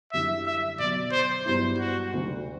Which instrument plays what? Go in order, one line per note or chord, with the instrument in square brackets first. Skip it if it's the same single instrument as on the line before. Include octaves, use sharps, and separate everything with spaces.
[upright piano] F#2 D3 G3 C4 E4 [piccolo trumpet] E5
[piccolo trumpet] E5
[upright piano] B1 B2 F#3 [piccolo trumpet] D5
[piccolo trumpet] C5
[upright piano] G2 F#3 B3 E4 [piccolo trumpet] C5
[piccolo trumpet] F#4
[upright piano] D2 C3 F#3 C4